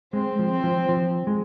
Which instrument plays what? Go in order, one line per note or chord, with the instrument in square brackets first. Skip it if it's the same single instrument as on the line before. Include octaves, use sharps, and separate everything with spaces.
[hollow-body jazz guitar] G#3 [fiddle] C4
[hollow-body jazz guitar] F3
[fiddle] C4
[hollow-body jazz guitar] F3
F3
G#3